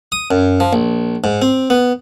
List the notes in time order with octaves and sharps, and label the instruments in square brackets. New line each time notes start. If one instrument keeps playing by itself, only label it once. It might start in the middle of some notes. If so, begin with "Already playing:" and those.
[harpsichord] D#6
F#2
F3
A#1
G#2
C4
B3